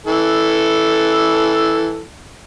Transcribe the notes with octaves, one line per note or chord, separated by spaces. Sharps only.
E3 A4